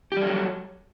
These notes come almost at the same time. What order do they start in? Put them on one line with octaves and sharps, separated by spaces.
G4 G3 A4 F#3